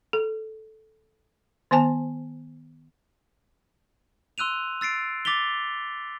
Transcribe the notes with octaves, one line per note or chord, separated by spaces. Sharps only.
A4
D#3 B3 C5 G#5 A5
C6 E6 F#6 D#7 F7
E6 A6 C7 D7
D6 A6 B6 F7 G7